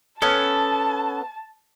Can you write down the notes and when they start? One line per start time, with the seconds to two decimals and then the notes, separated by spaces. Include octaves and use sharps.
0.22 B3 C#4 A4 A5